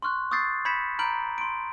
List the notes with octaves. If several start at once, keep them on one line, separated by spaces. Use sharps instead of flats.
C6 C#6 F6 F#6
C#6 D#6 E6 G6 A6 C7
B5 G6 G#6 B6 C#7 E7
A#5 B5 F6 G6 D7 F#7
C6 D7